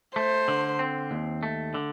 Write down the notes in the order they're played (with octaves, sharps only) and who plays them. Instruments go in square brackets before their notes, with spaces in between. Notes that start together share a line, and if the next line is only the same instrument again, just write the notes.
[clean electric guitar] A3 [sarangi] C5
[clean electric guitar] D3
C4
D#2
A3
D3